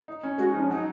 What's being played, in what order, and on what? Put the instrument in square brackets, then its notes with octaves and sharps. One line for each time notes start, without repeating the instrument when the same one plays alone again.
[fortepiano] D#4
C#4
[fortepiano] G#3 [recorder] F#4
[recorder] D#4
[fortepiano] F3 [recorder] C#4
[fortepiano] F#3 [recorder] D#4